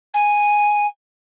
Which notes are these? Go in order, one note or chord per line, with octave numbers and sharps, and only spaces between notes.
G#5